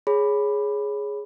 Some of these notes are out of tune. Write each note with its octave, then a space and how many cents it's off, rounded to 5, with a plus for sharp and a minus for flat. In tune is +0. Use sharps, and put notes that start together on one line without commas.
G#4 +0 C#5 +0 B5 +0